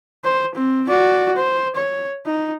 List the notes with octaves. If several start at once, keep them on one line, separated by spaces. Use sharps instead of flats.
C5
C4
F#4 D5
C5
C#5
D#4